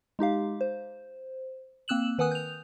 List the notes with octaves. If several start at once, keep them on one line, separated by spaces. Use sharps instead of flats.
G#3 D#4 G4 F5
C5
A#3 C4 E6 F#6 E7 F#7
D#3 B4 F#5 G#5 D#6 F#6
G6 F7